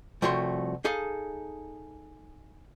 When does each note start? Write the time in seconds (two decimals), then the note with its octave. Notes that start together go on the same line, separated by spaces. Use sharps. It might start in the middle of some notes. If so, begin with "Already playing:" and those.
0.22 C2 F3 A3 F#4 C#5 C6
0.84 D#4 G#4 A4 F5